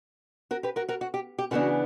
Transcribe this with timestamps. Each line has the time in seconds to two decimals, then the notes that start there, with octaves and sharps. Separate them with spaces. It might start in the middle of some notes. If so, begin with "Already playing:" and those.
0.51 F#4 A#4
0.63 G4 B4
0.76 F#4 A#4
0.89 F#4 A#4
1.01 F#4
1.14 G4
1.39 G4
1.51 C#3 E3 B3 D4 F#4